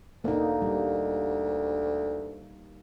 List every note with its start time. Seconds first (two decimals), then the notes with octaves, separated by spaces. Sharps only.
0.24 D2 A#3 D#4
0.62 G3